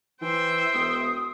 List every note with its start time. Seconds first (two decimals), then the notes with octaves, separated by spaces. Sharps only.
0.21 E3 C5 E5 G5
0.73 E1 D#6